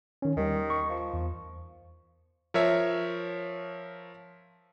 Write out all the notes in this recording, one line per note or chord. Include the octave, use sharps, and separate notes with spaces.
D#3 C#4
D#2 D#3 G3
C#6
F3
E2
F3 A#4 C#5 E5